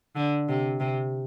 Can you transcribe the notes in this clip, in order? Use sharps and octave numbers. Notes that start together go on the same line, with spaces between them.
D3
C3
C3